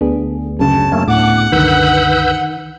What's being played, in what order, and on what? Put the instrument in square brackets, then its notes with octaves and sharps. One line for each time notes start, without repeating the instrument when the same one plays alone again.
[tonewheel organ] D2 [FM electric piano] B3 D4 G#4
[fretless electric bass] F#2 C#3 [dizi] A5
[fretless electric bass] F#2 [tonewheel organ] A3 A#3 C#4
[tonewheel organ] D2 D6 [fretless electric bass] A2 [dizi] F#5
[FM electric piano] C2 F#2 D3 [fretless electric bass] D#3 [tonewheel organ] B4 E6 G6